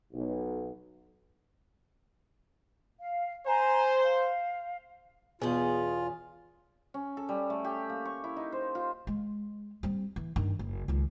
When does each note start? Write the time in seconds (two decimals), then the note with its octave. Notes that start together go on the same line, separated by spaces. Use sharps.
0.13 B1
3.00 F5
3.47 C5 G#5 A#5
4.05 F5
5.42 E2 B2 C#4 F4 G#4
6.94 C#4
7.17 A4
7.29 G3
7.50 A3
7.64 G4
7.90 A#3
8.05 C#6
8.24 E4
8.36 D#4
8.52 C5
8.75 F4
9.07 G#3
9.83 G3 C4
10.16 E3
10.36 G2 D#3
10.59 F#1
10.88 C#2 D#3